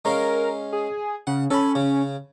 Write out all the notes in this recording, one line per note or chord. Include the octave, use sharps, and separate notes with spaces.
G#3 C#4 A#4 F5
G#4
C#3 F#5
C#4 A4 B5
C#3